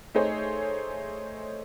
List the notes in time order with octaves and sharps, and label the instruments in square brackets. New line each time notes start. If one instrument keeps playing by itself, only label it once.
[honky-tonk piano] A3 D#4 G#4 C5 C#5